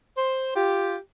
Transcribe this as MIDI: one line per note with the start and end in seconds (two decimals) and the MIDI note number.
0.16 0.53 72
0.56 0.95 65
0.56 0.95 67